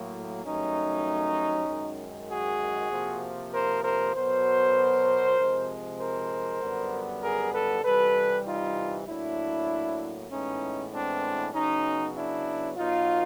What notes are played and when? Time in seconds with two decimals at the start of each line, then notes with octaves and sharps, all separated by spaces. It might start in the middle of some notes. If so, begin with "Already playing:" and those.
Already playing: A2 F#3 A#3
0.45 G2 D#3 F#3 A3 C#4 D#4
1.68 F#2 D#3 G#3
2.29 F#4 G#4
2.91 C3 F3 A#3
3.52 A#4 C5
3.84 A#4 C5
4.15 B2 F#3 B3 A#4 C5
5.37 C3 F3 G#3
5.99 A#4 C5
6.61 F#2 D3 G3 B3
7.22 G#4 A#4
7.53 A4 B4
7.84 C3 E3 G3 A4 B4
8.46 D#4 F4
9.07 A2 F#3 A#3 D4 E4
10.30 A2 E3 G#3 B3 C#4 D#4
10.93 C4 D4
11.54 C#3 F#3 B3 C#4 D#4
12.15 D4 E4
12.77 B2 F#3 B3 D#4 F4